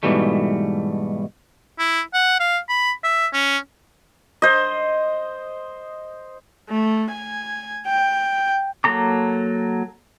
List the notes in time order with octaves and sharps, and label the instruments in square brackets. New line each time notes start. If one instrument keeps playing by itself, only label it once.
[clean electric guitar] G#2 B2 E3 G3 A3
[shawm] E4
F#5
F5
B5
E5
C#4
[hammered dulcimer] C5 D#5
[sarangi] A3
G#5
G5
[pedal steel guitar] F#3 A#3 A4 A#5 D6